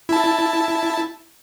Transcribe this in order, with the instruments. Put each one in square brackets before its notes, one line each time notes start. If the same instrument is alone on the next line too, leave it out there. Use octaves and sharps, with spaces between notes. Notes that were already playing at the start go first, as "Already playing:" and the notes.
[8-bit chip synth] E4 A5